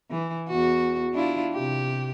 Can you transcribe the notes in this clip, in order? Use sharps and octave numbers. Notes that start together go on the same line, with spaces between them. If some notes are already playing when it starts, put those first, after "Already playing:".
E3
E2 F#4
D4 E4 F4
C3 G4